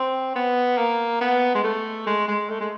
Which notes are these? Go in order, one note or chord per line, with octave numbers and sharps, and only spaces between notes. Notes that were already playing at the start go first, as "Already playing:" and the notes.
Already playing: C4
B3
A#3
B3
G#3
A3
G#3
G#3
A3
G#3